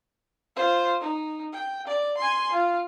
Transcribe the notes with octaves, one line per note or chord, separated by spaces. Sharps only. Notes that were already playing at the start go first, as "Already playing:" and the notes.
F4 C5
D#4
G5
D5
G#5 C6
F4